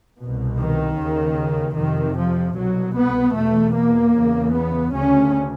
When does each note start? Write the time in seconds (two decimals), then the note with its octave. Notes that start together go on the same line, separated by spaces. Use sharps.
0.18 C2 B2
0.57 D#3
0.97 D#2 C#3
1.76 F2 C3 D#3
2.15 F3
2.55 C2 B2 F#3
2.94 B3
3.34 E2 B2 A3
3.74 A#3
4.14 E2 C#3
4.52 B3
4.92 D2 C#3 C#4